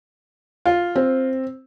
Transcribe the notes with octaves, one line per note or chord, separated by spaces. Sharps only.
F4
C4